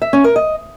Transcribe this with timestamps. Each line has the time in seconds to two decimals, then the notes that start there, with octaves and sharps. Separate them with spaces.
0.02 E5
0.13 C#4
0.24 A#4
0.36 D#5